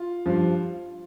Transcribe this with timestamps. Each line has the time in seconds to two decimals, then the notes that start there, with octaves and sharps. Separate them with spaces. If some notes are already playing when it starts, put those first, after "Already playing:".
Already playing: F4
0.26 G2 F3